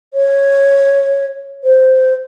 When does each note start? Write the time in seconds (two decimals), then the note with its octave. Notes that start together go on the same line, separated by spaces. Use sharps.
0.14 C#5
1.64 C5